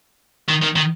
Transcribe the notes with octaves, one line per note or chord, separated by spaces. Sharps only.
D#3
D#3
D#3